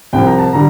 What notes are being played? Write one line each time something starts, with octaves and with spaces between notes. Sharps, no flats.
C2 C3 F3 G5
A#5
A5
D3 G3 A#5